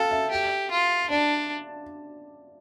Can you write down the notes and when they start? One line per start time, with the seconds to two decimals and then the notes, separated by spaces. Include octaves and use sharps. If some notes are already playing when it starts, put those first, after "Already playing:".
Already playing: A4 F5 G5 A5
0.11 E5
0.31 G4
0.71 F4
1.10 D4 D5